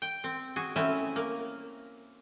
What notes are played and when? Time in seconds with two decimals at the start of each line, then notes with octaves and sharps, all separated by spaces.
0.02 G5
0.24 C4
0.56 F#4 G#4 G#5
0.76 A3 C4 C#4 E4 E5 G#5
1.16 A#3